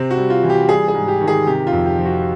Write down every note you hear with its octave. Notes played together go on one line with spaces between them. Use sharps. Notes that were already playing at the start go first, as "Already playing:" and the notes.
Already playing: C3 C4
F#4
G3
F4
E3
G4
G3 G#4
G#4
G#2
G4
D#3
G#4
C3 G4
F4
F2
G4
F3
F#4